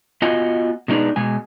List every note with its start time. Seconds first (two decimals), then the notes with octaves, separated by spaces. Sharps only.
0.22 B3 F4 F#4 D#5 F#5 G#5
0.88 B2 D#3 G#3 D4 D#4 B4
1.16 B2 G#3 G#5